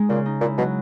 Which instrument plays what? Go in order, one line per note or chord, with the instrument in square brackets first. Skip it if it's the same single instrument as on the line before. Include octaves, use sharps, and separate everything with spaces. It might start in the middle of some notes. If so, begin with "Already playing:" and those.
Already playing: [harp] G#3 D#4
[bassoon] A#2 [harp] C#3
[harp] D#4
[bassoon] A#2 [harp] E4
[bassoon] B2 [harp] F#3